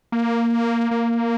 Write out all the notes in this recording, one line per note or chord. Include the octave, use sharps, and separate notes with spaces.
A#3
A#3